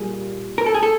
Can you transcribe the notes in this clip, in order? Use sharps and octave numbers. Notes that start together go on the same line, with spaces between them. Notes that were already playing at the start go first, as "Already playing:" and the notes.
Already playing: A#2 G3 A#3 G#4
A#4
A4
G#4
A4